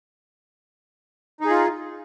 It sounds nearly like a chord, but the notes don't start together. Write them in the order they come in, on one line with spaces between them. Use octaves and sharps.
D#4 G#4 F4